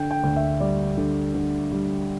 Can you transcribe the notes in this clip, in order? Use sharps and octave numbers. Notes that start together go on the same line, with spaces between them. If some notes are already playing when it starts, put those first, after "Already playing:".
Already playing: D3 G5
G5
D2
E5
G3 D5
D3
D3
G3